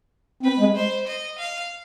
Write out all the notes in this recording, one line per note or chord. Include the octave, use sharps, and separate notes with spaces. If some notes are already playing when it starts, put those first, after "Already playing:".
C4 B4
G#3
C5
D#5
F5